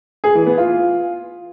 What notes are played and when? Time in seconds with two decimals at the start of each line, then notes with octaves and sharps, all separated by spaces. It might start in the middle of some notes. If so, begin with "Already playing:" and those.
0.24 G#4
0.35 E3
0.46 B3
0.58 F4